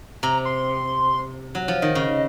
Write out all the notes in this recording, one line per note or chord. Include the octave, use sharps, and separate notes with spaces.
C3 A#5
C6
F#3
F3
D#3 D#5
C#3